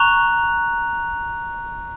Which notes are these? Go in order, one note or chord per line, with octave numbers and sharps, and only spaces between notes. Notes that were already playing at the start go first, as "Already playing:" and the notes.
Already playing: A#5 C#6 F#6 F7